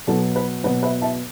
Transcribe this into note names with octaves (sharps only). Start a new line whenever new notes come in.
B2 F#3 B3 A4
B4
B2 F#3 B3 B4
B4 E5
E5 A5